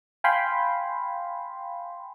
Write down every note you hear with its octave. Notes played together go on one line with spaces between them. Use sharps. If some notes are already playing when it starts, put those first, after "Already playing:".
F5 G5 G#5 B5 C6